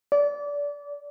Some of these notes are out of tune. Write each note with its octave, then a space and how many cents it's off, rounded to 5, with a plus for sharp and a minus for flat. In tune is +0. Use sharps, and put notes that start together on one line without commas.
D5 -25